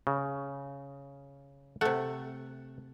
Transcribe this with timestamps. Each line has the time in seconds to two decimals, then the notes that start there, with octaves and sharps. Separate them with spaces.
0.07 C#3
1.81 C3 A3 F#5